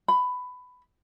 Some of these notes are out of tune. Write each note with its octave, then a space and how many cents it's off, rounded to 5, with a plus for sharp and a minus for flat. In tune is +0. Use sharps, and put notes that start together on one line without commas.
B5 +15